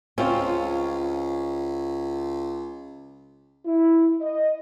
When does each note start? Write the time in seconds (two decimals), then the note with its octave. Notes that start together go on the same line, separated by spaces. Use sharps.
0.18 C#2 C4 C#4 F4 C#5
3.65 E4
4.21 D#5